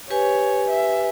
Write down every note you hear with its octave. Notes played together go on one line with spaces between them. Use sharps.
G4 B4 C#5 G#5
E5